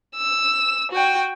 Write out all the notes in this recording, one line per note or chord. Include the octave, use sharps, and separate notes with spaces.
E6
F#4 G5